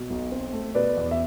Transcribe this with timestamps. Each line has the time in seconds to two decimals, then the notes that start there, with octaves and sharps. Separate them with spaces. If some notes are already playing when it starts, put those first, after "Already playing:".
Already playing: B2
0.10 B1
0.32 C4
0.53 A3
0.75 B2 B4 D5
0.97 E2
1.11 E5